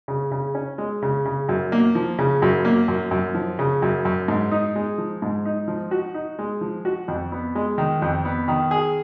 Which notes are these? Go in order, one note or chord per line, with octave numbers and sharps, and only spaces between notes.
C#3
C#3
C#4
G#3
C#3
C#3
F#2
A#3
F3
C#3
F#2
A#3
F#2
F#2
F3
C#3
F#2
F#2
G#2
D#4
G#3
F3
G#2
D#4
F3
F#4
D#4
G#3
F3
F#4
F2
B3
G#3
D#3
F2
B3
D#3
G#4